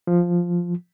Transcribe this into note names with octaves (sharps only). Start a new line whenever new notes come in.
F3